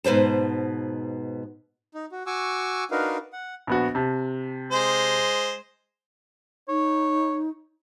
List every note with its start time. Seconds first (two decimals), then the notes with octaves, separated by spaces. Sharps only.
0.04 G#2 B2 B4 C5 A5
1.94 D#4
2.12 F#4
2.26 F#4 G#5 C#6 D6 E6
2.91 D4 D#4 F#4 A#4 B4 F5
3.33 F#5
3.67 A#1 B3 F#4
3.95 C3 A5
4.72 G#3 C5
6.69 D#4 C#5